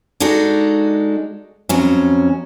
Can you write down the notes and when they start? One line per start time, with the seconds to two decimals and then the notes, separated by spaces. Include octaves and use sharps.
0.20 G#3 D4 D#4 F#4 A4
1.69 F2 F#3 C#4